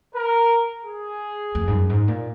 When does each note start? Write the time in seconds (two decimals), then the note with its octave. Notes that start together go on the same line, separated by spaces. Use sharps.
0.14 A#4
0.84 G#4
1.55 F2
1.68 G#2
1.72 F#2
1.89 G#2
2.08 A#2